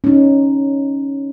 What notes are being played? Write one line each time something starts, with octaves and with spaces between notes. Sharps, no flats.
C#4 D#4